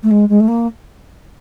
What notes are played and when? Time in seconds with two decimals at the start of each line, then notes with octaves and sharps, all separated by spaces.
0.03 A3
0.11 G#3
0.29 G#3
0.40 A3
0.48 A#3